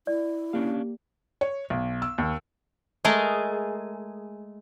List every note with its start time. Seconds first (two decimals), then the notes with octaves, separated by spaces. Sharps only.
0.07 E4 D5
0.53 A#3 C#4 D4 G4 F5
1.41 C#5
1.70 B1
2.02 E6
2.18 D#2
3.05 G#3 A3 G#4 A#4 D#5